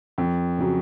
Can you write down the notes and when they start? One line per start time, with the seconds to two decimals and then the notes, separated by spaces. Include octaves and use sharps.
0.18 F2
0.58 C#3 F#3